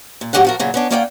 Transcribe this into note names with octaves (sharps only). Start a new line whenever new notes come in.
A#2
A2 F#3 G3 G4 G#4 F#5
F3 F#4 A#4
A#2 C#3 F#3
B3 C#4 D4
A#3 C#4 F4 D5 F#5 G5